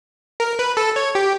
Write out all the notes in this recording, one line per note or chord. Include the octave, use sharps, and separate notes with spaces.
A#4
B4
A4
C#5
G4